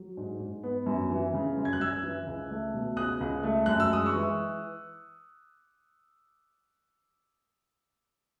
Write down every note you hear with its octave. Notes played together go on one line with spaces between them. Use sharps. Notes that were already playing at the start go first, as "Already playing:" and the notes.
Already playing: F#3
G#2
G#2
B3
F#2
E3
C#3
F#2
G#6
F#6
F#2 E6 G#6
E3
C#2
A3
B2
C#2 D#6 F#6
C#2
A3
F#2 F#6
E6
G#3 D#6
C#6 E6
E3